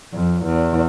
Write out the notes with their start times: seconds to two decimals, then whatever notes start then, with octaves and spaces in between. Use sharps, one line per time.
0.14 F2
0.45 E2